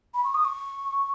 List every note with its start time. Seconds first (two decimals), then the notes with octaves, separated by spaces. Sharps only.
0.14 B5
0.24 C#6
0.35 D#6
0.45 C#6